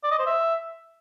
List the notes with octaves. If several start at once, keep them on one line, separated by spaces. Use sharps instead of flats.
D5
D#5
C5
E5